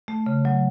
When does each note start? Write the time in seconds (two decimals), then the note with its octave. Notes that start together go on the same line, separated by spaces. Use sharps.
0.08 A3
0.26 C#3
0.45 F#3